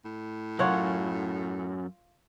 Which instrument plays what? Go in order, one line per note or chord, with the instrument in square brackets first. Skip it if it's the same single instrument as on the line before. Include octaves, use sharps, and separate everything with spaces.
[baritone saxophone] A2
[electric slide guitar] F#2 [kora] F4 C#5 F#5